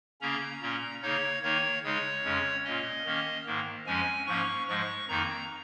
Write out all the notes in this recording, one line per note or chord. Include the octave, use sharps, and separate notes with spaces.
C#3 A#3 C#4 A#5
A#2 A#3 C#4
C#3 A#3 D#4 C#5
D#3 A#3 D#4 C#5
C#3 G#3 D#4 C#5
F2 C#3 G#3 C#4
A#2 A#3 C#4 D#5
D#3 A#3 C#4
G#2 D#3 A#3
F2 F3 G#3 C#4 G#5
G#2 F3 A#3 C#4 C#6
G#2 F3 G#3 C#6
F2 D#3 A#3 D#4 A#5